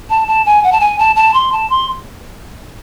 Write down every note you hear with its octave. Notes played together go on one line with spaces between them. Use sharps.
A5
A5
G#5
F#5
A5
G#5
A5
A5
C6
A5
C6